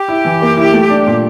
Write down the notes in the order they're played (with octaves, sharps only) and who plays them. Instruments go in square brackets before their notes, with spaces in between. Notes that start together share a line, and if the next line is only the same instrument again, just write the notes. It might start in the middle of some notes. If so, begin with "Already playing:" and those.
Already playing: [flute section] G4
[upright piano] E4
E3
A#3
E4
A3
D4
A#2